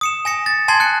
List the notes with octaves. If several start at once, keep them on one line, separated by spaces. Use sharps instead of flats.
D#6 C#7 E7
G#5 A#6 C#7
A6
G#5 A5 C6 G#6 C7
F#6 C#7